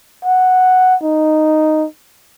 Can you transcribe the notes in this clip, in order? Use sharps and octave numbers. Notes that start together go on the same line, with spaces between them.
F#5
D#4